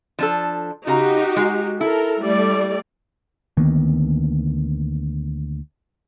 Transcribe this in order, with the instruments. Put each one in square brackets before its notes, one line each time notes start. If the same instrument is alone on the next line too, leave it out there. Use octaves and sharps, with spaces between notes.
[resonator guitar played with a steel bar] F3 D4 A4
[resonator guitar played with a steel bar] C#3 A#5 [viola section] D#4 F#4 G4
[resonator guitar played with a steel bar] G#3
[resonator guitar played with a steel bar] E4 [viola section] A4 A#4
[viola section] G3 A3 D5
[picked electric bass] D2 D#3 A#3 B3